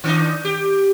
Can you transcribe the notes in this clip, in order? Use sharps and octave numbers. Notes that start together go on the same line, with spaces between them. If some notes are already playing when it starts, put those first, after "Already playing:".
D#3 D4 D#4
G4